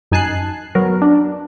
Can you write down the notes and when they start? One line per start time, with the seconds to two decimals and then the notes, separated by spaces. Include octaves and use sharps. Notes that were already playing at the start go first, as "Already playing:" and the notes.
0.11 F#2 D#4 G#5 A5 F#6 C7
0.75 F#3 B3 F#4 A#4
1.02 D4